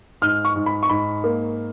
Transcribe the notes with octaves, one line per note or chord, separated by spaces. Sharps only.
G#2 F6
C#6
G#2
B5
C#6
G#2 B5
A#3